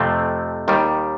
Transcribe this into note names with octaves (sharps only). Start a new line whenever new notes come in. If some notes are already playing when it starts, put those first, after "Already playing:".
Already playing: F2 C3 F3 A3 C4
D#2 D#3 G3